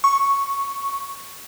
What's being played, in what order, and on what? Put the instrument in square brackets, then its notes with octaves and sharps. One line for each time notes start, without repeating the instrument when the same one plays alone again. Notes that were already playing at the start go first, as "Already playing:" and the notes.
[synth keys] C#6